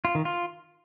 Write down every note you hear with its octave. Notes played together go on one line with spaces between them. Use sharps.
F4
D#3
F4